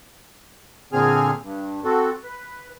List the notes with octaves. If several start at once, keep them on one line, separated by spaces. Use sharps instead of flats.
A#2 D3 C4 G#4 G#5 F6
G2
C4 F#4 A4
B4